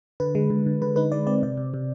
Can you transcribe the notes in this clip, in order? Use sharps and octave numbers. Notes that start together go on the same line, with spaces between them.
D3 B4
G#3
D3
D3
D3 B4
D#4 B4
G#3 D5
C4 D5
C3 D5
C3
C3